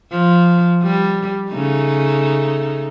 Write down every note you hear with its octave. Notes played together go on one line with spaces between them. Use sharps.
F3
G3
C#3 A3 D#4